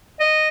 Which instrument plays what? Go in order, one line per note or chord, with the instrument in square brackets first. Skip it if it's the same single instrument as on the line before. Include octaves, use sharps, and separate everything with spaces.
[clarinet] D#5